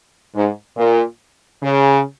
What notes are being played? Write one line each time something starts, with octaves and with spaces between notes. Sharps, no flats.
G#2
A#2
C#3